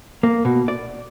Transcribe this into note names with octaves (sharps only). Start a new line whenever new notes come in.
A#3
B2
D5